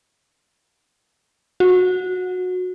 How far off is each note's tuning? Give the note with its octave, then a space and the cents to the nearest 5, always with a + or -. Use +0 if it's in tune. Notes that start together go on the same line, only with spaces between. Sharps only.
F#4 -20